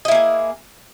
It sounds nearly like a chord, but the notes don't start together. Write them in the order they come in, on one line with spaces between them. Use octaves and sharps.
D#5 E4 A#3 G#4